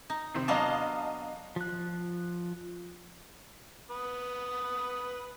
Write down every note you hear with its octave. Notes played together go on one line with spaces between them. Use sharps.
D#4
C3 D#3 C4
F#3 B3 D4 D#5 F5 A5
F3 F#6
B4 D#6